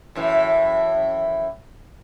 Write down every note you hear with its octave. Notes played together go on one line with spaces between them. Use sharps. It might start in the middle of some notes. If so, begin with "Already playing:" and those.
F#2 A2 E3